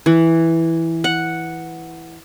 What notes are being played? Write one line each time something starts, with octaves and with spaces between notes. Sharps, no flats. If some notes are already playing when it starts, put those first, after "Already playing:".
E3
F#5